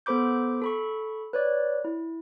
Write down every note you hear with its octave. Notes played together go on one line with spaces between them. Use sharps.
B3 A4 C5 B5 D6 G6
A4 B5 C#6
B4 C#5 D5
E4